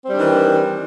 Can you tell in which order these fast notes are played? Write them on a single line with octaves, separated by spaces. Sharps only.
C4 G3 D4 D#3 E3